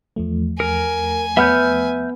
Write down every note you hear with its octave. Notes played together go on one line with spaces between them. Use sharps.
E2 F3 A3
A#4 G#5
B3 E5 F6 G6